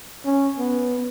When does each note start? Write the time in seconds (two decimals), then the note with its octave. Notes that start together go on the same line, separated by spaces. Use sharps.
0.25 C#4
0.59 B3